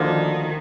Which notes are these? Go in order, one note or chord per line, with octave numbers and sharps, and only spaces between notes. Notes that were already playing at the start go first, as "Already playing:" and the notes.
Already playing: D2 D3 D#3 F3 A#3